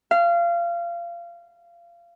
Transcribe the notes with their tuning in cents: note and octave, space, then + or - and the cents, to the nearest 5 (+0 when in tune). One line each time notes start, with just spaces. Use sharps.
F5 -25